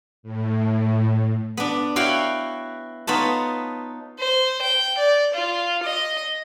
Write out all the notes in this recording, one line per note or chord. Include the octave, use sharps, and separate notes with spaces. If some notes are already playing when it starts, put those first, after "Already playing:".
A2
B3 D4
E4 F#4 C#5 F5 G5
B3 D#4 F4 B4 C#5 A5
C5
G5
D5
F4
D#5